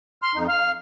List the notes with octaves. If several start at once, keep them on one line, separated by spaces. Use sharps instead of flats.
C6 F6
F2 D#4
F5 F6